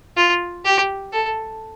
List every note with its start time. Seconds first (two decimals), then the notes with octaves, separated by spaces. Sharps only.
0.17 F4
0.65 G4
1.12 A4